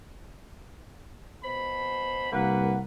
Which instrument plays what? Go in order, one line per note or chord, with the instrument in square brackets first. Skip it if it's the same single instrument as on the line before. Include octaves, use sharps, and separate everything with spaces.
[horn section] B2 C5 B5
[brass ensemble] C2 F#5 [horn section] A#3 B4